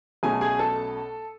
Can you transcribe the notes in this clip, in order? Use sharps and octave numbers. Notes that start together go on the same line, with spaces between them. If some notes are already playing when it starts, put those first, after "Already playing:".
B1 B2 A3 C#4 G#4 G#5
G#4 G#5
A4 A5